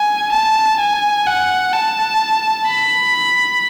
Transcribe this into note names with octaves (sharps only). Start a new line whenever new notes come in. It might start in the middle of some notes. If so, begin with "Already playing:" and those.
Already playing: G#5
A5
G#5
F#5
A5
B5